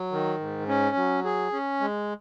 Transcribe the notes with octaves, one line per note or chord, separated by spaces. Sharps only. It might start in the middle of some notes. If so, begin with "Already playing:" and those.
Already playing: F#3
D#3
G#2
C#4
F#3
G#4
C#4
G#3